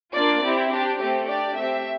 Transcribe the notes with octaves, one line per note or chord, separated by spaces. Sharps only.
A#3 D4 F4 D5
C4 E4 G4
D4 G4
A3 C4 G4
D4 G4 D5
A3 C4 G4 E5